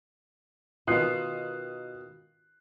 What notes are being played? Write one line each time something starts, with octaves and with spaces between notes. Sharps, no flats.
B2 D#3 F4 D#6 F#6 C7